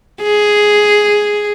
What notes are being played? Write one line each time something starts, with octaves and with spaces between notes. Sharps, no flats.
G#4